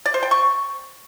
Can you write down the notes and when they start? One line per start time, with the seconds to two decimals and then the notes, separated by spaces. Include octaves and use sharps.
0.06 D5
0.14 C5
0.23 G5
0.31 C#6